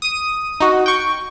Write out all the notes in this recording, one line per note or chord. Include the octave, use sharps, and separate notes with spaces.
D#6 D#7
D#4 F#4
G5 C#6